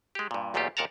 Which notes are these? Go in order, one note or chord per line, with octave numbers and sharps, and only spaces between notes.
G#3 G4
G2 A#2
B1 E2 A#2 A3 F4 G4
D#2 A#2 A#4 F#5 A5 A#5